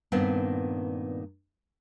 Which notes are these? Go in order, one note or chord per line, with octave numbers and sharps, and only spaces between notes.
G2 A#2 D#3 B3 C4